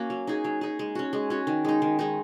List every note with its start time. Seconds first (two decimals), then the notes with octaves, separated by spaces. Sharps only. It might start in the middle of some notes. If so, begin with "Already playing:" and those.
Already playing: A#3 C#4 F#4
0.10 F#3
0.27 D#4 G#4
0.44 F#3
0.61 D#4 G#4
0.79 G#3
0.95 C#4 F#4
1.13 G#3
1.30 C#4 F#4
1.47 D#3
1.64 G#3 D#4
1.82 D#3
1.99 G#3 D#4